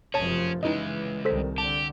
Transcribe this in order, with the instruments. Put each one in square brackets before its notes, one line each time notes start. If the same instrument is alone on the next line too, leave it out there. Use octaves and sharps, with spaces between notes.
[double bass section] F1 F#2 F3 [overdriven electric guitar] C#4 G#4 [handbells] C#5 A5
[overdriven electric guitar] C#2 G#3 [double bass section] E3 [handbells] D#4 E4 D#5
[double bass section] C2 D#3 [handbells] A4 C5 B6
[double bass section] D3 [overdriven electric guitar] G4 [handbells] A5